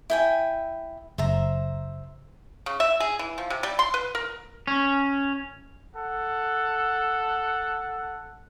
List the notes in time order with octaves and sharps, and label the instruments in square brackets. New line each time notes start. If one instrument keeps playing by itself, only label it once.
[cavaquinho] E4 G5 G#5
[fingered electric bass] F#1 [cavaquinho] C5 E5 A#5
[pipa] C#3
E5
G#4
E3
F3
C3
G3
C6
B4
A#4
[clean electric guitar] C#4
[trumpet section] A4 F#5